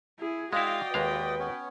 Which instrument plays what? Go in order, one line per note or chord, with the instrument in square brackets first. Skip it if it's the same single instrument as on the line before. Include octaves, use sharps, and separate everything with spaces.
[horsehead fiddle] E4 G#4
[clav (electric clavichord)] G#3 E4 [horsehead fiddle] F#4 G5 [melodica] D5 D#5 D#6 [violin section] F5
[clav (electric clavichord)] D#2 G#3 F5 [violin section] B4
[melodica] B3 C#4 C#5